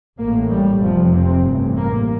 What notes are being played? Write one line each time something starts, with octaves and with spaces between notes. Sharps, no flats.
A1 A2 A#3
G3
F1 F2 C3 F3
C4
A1 G2
A#3